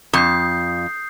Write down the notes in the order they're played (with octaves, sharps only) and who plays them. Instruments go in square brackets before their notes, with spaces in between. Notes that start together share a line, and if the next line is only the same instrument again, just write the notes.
[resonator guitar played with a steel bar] F2 [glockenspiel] D#6 G6 C7